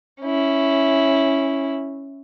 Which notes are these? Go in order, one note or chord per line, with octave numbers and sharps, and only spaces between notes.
C#4 E4